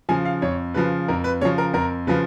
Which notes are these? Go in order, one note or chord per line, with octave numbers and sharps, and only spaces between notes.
C#3 F3 G#5
F5
F2 C#5
C#3 F3 B4
F2 A#4
B4
C#3 F3 C#5
A#4
F2 A#4
C#3 F3 B4